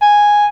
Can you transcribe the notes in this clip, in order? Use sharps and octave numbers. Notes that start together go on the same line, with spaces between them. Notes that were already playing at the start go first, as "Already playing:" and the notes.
G#5